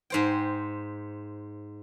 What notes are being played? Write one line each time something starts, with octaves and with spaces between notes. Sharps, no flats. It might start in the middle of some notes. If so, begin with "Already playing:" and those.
G#2 C5 G5